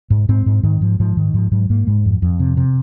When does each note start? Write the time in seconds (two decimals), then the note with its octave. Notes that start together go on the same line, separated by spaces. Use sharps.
0.10 G#2
0.29 G#2 C4
0.46 G#2
0.63 G#2 D#3
0.81 G#2 F3
1.00 G#2 F3
1.17 G#2 D#3
1.34 G#2 F3
1.51 G#2 F#3
1.70 G#2 A#3
1.87 G#2 G#3
2.05 F2
2.22 F2
2.40 C3
2.57 C3